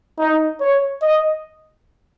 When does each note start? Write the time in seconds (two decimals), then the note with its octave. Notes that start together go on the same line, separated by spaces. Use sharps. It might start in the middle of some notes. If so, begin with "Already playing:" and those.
0.18 D#4
0.60 C#5
1.02 D#5